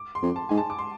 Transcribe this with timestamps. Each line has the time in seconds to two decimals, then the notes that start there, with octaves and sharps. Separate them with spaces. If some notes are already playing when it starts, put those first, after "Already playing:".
Already playing: D6
0.15 C6
0.22 F2
0.36 A5
0.49 G#2 G#5
0.57 A5
0.70 D6
0.79 C6